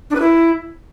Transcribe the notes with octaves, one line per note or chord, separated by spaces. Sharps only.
D4
B4
E4